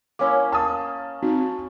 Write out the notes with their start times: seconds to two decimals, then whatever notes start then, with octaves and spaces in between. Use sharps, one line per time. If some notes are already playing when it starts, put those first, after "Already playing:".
0.19 A#3 C#4 E4 C#5 D6
0.52 F5 A5 D#6
1.23 C4 D#4 F#4